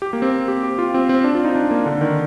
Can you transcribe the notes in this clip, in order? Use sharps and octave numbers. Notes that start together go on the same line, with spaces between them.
G4
A#3
C4
G4
G4
F4
C4
C4
D4
F4
D#4
D4
A#3
D3
D#3